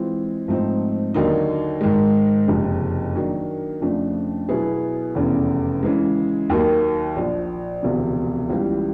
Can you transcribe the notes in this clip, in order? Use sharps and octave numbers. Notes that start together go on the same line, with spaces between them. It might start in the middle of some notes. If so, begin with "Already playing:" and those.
Already playing: E3 G#3 C4 F4
G#2 F3 A3 C4 D#4
D#2 D3 F#3 A#3 D#4
G#2 D#3 G#3
F#1 F2 C3
D#3 F#3 A#3 D4
F2 C#3 F3 A3 D4
B2 F#3 B3 E4 G#4
F1 E2 C#3
C#3 E3 G#3
D#2 D#3 F#3 A#3
A#1 A#2 F3
E1 D2 C3 F3
C#2 C#3 E3 G3